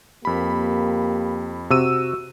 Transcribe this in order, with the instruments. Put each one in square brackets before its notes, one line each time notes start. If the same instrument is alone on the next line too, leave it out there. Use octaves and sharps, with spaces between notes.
[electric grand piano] F2 B5 [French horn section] A#3 G4
[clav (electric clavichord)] C3 [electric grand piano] F#4 E6 D#7